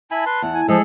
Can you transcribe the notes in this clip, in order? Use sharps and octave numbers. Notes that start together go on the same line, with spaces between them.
E4 G#5 A5 B5
B4 C6
E2 F#5
G#5
F3 G#3 G#4 A4